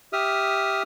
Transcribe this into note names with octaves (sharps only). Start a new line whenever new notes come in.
G4 E5 D#6 F6